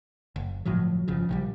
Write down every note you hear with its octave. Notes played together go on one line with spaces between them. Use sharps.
F#1
G1 A2 F3 F#3
G1 C#3 F3
A#1 E3 G3